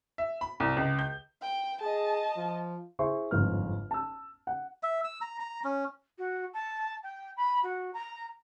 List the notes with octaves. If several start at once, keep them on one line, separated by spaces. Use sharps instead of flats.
E5
B5
C2
C#2
G6
G5
G#4 D#5 A5
F3
E4 G#4 C5 E5 C6 C#6
G1 F2 G#2 B4 F6
A5 E6
F#5
E5
E6
A#5
A#5
C#4
F#4
A5
G5
B5
F#4
A#5